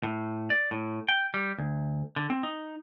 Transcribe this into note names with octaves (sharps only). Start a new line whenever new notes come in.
A2
D5
A2
G5
G3
D2
D3
C4
D#4